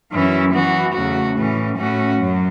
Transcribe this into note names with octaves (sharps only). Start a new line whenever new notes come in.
F#2 E3 C#4 E4
E3 B3 F#4
E2 C#3 A3 F#4
A2 E3 C#4
A2 A3 C#4 F#4
F#2 F#3